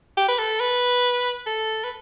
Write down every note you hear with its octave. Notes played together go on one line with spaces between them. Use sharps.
G4
B4
A4
B4
A4
B4